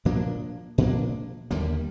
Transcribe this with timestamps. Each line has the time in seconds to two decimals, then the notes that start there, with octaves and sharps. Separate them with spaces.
0.05 A#2 F3 A#3 D4
0.78 A#2 F3 A#3 D4
1.51 D#2 D3 G3 A#3